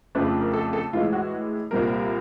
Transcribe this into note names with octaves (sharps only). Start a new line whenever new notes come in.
F2 C#3 F3 A3 D4 B4
A#4
A4
A4
A2 E3 G#3 F4
F#4
C2 A#2 G3 C4 A#4